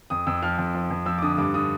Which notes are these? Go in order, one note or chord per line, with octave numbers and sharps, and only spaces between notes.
F2 D#6
F2 E6
F3 F6
F2
F3
F2
F3 E6
D6
D3 D#6
G2 D6
D3 D#6